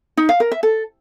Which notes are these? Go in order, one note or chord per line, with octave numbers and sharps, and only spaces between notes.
D#4
F5
A#4
E5
A4